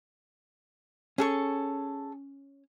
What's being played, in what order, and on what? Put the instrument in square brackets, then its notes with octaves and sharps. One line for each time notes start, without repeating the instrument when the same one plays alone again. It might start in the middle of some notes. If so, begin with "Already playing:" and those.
[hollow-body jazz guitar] C#4 [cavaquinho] G#4 A4 C#6